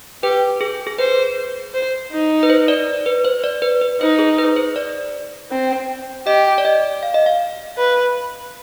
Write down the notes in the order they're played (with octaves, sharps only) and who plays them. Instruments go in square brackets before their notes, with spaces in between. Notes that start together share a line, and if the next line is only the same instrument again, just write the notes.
[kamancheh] G4 [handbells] B4
[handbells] G#4
G#4
[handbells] B4 [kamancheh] C5
[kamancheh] C5
D#4
[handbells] B4
C5
D5
B4
C5
D5
B4
B4
[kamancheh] D#4 [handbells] C5
[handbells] G#4
B4
C5
D5
[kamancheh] C4
[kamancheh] G4 [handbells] D#5
[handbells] D5
D#5
F5
D#5
F5
[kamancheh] B4